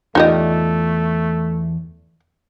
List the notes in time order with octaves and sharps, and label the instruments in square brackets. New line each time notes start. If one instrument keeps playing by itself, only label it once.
[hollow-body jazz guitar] E2 F4 D5 [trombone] A3 [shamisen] D#4 G4 D#5